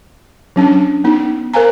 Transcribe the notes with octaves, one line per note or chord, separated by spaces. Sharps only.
F#3 C#4 D4
B3 D#4
A#4 C5 F5 G#5 A#5